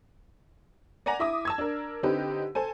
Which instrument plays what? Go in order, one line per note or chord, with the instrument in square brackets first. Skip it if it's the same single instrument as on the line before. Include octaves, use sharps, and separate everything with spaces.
[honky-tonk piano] D5 F#5 G#5 A#5 A#6
E4 E5 D6 D#6
A5 E6 G#6
D4 A#4
D3 C4 D#4 G4 B4
A4 C5 G#5